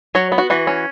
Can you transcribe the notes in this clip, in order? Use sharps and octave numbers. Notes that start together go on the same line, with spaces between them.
F#3 C#5
B3
F#4
E3 F#4
C#4